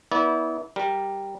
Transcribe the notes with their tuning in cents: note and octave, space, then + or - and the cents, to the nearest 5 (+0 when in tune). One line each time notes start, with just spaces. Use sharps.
B3 -20 E4 -30 D5 -35
G3 +0 A#4 +0